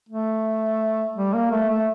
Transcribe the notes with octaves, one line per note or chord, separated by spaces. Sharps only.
A3
G3
A#3
A3
A3